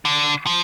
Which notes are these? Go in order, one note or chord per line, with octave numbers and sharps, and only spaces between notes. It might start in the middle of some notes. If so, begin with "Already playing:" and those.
D3
F3